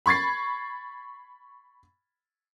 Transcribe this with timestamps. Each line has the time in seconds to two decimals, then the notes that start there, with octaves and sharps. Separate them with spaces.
0.06 B5 C#6 G#6 A6 C7